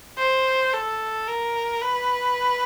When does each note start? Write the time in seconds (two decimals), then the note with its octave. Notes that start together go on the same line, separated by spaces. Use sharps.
0.18 C5
0.73 A4
1.28 A#4
1.82 B4